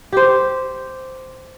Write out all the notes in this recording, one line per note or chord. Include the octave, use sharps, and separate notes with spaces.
G4 C5